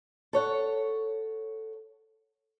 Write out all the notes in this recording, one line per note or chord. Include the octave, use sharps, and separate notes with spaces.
A4 C#5 F#5